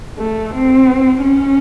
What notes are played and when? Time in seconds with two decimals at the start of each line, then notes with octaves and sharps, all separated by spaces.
0.19 A3
0.54 C4
1.23 C#4